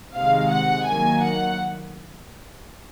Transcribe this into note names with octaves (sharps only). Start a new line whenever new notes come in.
C3 D#3 G#3 F5
F#5
D#3 F#3 A#3 G#5
F#5